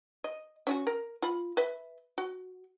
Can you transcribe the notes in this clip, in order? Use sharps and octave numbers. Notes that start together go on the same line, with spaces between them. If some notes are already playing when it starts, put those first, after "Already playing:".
D#5
C#4 F4 F#4
A#4
F4 B5
B4 E5
F#4